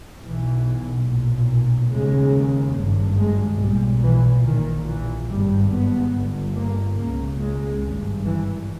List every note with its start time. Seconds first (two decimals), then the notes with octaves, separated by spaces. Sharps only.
0.23 B1 B2 E3
1.08 B1 A#2
1.92 D#2 C#3 G#3
2.76 G#1 G2
3.18 G#3
3.60 B1 A#2 G3
4.03 E3
4.45 A#1 A#2 D#3
4.87 E3
5.29 G#1 G2 G3
5.71 B3
6.14 G1 G2
6.55 A#3
6.97 C#2 C#3 A#3
7.40 G#3
7.82 G#1 G2
8.24 E3